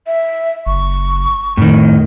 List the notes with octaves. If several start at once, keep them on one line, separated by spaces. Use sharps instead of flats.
E5
F#1 C#6
F2 A2 D#3